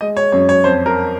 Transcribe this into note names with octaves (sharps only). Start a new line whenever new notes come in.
G#3 D#5
C#5
F#2 C#5
C#5
F2 C5
A#4